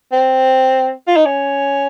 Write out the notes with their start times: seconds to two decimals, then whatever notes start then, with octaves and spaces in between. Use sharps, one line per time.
0.12 C4
1.07 F4
1.17 D#4
1.26 C#4